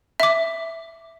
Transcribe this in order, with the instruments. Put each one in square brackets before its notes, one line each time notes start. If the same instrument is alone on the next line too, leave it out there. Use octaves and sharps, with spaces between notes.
[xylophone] E5 D6